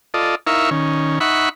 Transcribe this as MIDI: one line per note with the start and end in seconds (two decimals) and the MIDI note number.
0.14 0.35 65
0.14 0.35 69
0.14 0.35 74
0.14 0.35 75
0.47 0.70 63
0.47 0.70 64
0.47 0.70 70
0.47 0.70 76
0.47 0.70 77
0.47 0.70 85
0.71 1.19 51
0.71 1.19 61
1.20 1.49 63
1.20 1.49 76
1.20 1.49 78
1.20 1.49 83
1.20 1.49 85